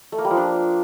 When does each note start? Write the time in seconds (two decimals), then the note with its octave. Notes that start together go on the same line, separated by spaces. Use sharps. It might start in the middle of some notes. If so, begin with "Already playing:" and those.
0.12 A3
0.18 A#3
0.25 G3
0.31 F3
0.37 D4